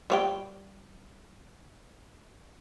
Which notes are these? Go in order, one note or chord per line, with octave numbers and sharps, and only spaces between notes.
G3 C#5 G5